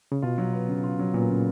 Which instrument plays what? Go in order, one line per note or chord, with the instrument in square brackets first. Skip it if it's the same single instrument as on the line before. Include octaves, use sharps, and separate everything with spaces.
[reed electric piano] C#3
[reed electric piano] B2 [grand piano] F4
[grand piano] F#3
B3
C#3
F4
F#3
[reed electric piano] A#2 [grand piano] B3
[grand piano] C#3